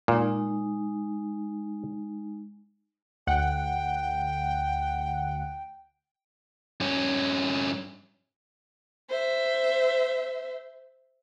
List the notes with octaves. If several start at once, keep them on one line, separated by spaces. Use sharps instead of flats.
A#2 G#3 D#4
D2 F#5 G5
G2 C#4
C5 E5